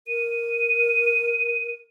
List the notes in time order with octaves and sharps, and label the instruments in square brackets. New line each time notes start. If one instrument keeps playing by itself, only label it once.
[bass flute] A#4 [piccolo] D#7